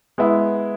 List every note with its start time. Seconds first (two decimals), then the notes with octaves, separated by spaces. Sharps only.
0.18 G#3 B3 E4